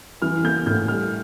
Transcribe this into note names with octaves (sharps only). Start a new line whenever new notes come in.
E3 F6
A#3 G6
A2 G6
G3 F6